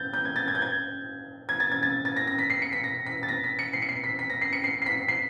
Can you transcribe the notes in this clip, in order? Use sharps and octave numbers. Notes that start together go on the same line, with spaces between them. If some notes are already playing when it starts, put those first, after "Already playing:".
Already playing: G6 A6
G6
G#6
A6
G#6
G6
G#6
G#6
A6
G#6
A6
A6
A#6
A#6
B6
C7
C#7
B6
A#6
B6
A6
A#6
B6
C#7
C7
C#7
C7
B6
B6
A#6
C7
C#7
C7
C7
B6
C7